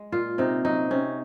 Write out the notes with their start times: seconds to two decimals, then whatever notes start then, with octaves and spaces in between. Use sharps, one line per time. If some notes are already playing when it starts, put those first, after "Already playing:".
Already playing: G#3
0.12 A#2 F4
0.38 C3 D#4
0.65 F#3 D#4
0.91 C3 C#4